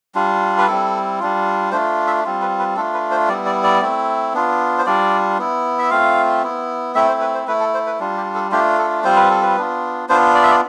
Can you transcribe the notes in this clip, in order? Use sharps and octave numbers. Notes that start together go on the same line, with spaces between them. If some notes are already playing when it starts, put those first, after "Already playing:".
G3 D4 F4
B4
G3 C4 E4 A4
G3 D4 F4
A3 D4 F4 C5
E5
G3 C4 F4
B4
B4
A3 D4 F4 A4
B4
C5
G3 B3 E4 D5
D5
D5
A3 C4 E4
B3 D4 F4
C5
G3 D4 F4 D5
B3 E4
E5
A3 C4 F4 F5
B3 E4
A3 C4 E4 E5
C5
B4
C5
A3 E4 B4
A4
C5
B4
G3 D4 F4
G4
A4
A3 D4 F4 G4
A4
G3 C4 F4 C5
B4
A4
B4
B3 D4 F4
B3 D4 F4 C5
D5
E5
D5